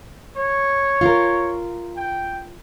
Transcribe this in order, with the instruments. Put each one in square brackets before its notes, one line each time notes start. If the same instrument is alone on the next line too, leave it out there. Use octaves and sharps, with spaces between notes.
[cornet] C#5
[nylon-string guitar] F4 A#4
[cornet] G5